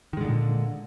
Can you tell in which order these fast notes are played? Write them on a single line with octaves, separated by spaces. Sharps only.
D#3 G#3 D3 A#2